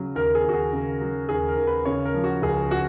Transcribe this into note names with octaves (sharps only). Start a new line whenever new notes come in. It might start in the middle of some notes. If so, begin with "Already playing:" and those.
Already playing: C#3 F#3
D#2 A#4
G#4
D#2 F#4
G#4
C#3
F#3
D#2 G#4
A#4
D#2
B4
C#3 C#5
A#4
F3
F#4
C#2 G#4
F#4